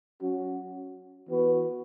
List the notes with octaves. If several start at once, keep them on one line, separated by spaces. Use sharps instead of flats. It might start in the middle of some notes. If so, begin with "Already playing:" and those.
F#3 C#4 F#4
E3 B3 F#4 B4